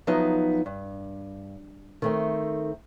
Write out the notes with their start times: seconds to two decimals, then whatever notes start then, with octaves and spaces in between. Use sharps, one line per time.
0.07 F3 F#3 B3 D#4 E5
0.66 G2
2.02 D#3 A3 C4